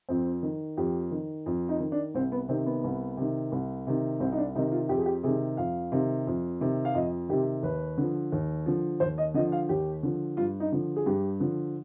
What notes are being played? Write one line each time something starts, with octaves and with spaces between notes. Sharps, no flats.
F2 C4
D#3
F2 G4
D#3
F2
D#4
D#3
D4
C2 C4
B3
C3 D#3 C4
B3
C2
C3 D#3
C2
C3 D#3
C2 C4
D#4
D4
C3 D#3 D#4
F4
F2 G4
G#4
G4
C3 D#3 G#4
F2 F5
C3 D#3
F2
C3 D#3
F5
F2 D#5
C3 D#3 G4
D#2 B4
D3 F3
D#2
D3 F3
D#2 C5
D#5
D3 F3 D#5
F5
D#2 G4
D3 F3
G2 F4
D#4
D3 F3
G#4
G2 G4
D3 F3